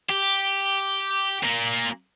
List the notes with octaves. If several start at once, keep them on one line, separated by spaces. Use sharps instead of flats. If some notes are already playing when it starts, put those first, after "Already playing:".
G4
A#2 A#3